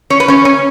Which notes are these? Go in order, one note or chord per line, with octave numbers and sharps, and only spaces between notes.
C#4 C#5
B4
C#4 C#5
C#4